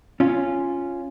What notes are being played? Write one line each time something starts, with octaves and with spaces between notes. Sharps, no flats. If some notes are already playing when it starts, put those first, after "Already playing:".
C#4 F4